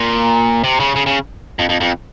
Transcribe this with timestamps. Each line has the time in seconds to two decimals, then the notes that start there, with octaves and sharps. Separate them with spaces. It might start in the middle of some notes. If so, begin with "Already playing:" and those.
Already playing: A#2
0.64 C3
0.80 C#3
0.96 C#3
1.06 C#3
1.59 F2
1.69 F2
1.81 F2